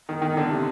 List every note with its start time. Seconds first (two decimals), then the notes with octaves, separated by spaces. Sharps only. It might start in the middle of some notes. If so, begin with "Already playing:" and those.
0.09 D#3
0.22 D#3
0.37 D3
0.50 C3